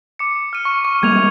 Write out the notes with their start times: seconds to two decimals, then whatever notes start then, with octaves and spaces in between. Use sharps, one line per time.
0.19 D6 C#7
0.53 F6 D#7
0.65 C#6
0.85 C#6
1.03 G3 G#3 A#3 G#6 F7